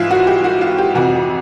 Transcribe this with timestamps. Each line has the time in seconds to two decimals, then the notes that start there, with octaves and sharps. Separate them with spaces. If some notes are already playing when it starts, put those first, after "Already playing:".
Already playing: G#2 E3 E4 F4
0.11 F#4
0.27 G4
0.44 F#4
0.61 F4
0.78 G4
0.95 F2 C3 E3 F#4